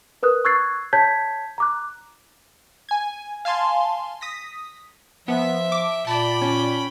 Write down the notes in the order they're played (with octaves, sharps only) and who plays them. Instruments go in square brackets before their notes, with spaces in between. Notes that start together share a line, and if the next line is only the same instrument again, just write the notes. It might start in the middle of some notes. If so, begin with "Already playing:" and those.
[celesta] A#4 B4 D#6 F#6
C#6 E6 F#6 G#6 A6 C7
C#5 A5 G6 G#6 B6
A#5 D6 F#6
[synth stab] G#5 G#6
F5 G#5 A5 C6
D#6 A#6 B6
[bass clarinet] F3 [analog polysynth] B3 [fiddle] E5
[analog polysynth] D6
[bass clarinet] A#2 [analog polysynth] D5 A5 [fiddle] G5 B5
[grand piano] C#4